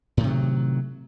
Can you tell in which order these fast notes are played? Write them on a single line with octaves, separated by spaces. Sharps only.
A2 D#3 C3 F#3